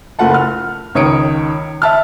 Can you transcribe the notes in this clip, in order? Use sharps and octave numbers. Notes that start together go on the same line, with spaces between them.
F#1 A3 F4 F#5 A5
F6
C#2 D#3 C#5 D#6 C#7 D7
E5 A5 F6